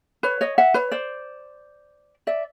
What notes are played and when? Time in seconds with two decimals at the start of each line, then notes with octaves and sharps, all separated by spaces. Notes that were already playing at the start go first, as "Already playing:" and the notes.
0.23 B4 C#5
0.41 C#5 D#5
0.58 E5 F#5
0.74 B4 C#5
0.91 C5 D5
2.27 D5 E5